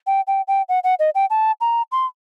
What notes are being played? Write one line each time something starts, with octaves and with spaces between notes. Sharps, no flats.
G5
G5
G5
F#5
F#5
D#5
G5
A5
A#5
C6